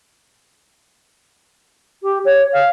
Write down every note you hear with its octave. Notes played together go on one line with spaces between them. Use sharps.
G4
C#5
F5